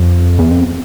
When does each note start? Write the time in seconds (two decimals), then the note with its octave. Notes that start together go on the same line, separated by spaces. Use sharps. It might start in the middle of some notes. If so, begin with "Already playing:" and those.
Already playing: F2
0.39 E2
0.51 F2